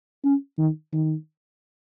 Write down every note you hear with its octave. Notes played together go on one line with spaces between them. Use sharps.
C#4
D#3
D#3